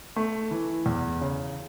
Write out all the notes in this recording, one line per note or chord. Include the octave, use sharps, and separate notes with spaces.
A3
E3
E2
C#3